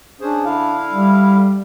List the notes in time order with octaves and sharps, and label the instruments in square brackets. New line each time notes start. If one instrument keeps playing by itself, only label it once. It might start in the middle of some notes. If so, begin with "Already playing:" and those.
[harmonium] C#4 G#4 C5 [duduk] D4
[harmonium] D3 E4 F5
[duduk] G3